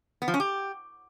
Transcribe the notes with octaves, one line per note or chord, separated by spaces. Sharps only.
B3
F3
C#4
G4